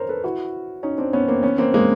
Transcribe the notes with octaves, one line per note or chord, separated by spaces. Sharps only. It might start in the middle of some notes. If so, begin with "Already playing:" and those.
Already playing: A#4 C5 C#5
A4 B4
E4 F#4
C#4 D#4
C4 D4
B3 C#4
A#3 C4
B3 C#4
A#3 C4
G#3 A#3